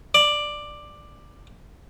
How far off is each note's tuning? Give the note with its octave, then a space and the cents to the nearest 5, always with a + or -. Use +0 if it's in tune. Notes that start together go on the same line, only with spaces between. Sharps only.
D5 +10